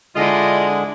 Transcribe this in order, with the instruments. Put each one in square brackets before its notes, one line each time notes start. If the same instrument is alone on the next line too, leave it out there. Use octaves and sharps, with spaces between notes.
[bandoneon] D3 G#3 [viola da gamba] D4 E4 [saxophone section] F4 D#5